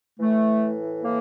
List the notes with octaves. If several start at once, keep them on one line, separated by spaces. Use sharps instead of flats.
A2 E3 A3
A2 E3 A#3